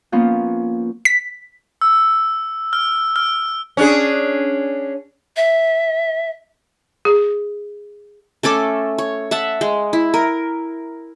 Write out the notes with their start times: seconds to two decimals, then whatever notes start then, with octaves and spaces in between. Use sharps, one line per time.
0.12 F3 A#3 B3 C#4 F4
1.05 B6
1.81 E6
2.73 F6
3.16 F6
3.77 C#4 D4 G#4
5.36 E5
7.05 G#4
8.43 A3 C#4 A4 D6
8.98 C#5
9.31 E5 F#5 A5
9.61 G#3
9.93 E4
10.14 A#4